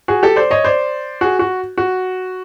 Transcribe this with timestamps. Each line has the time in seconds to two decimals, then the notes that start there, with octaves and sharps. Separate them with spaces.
0.08 F#4 G#4
0.23 G4 A4
0.36 C5 D5
0.51 C#5 D#5
0.64 C5 D5
1.21 F#4 G#4
1.39 F#4
1.78 F#4